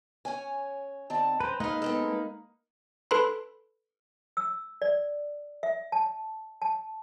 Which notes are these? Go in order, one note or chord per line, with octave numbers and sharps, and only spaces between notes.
C#4 C#5 G#5
D#3 C4 D5 A5
C#4 B4 C5 A#5
G#3 A#3 D#4 B4 D#5 F5
B3 C4 A4
A4 B4 B5 C6
E6
D5
E5
A5
A5